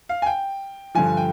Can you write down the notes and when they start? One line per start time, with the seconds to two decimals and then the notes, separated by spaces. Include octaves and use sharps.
0.09 F5
0.22 G#5
0.26 G5
0.95 G2 D3 F3 G#5
1.17 G5